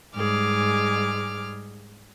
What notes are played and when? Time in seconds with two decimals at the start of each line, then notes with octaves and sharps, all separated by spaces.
0.15 G#2 G3 G#3 G#4 D6 F6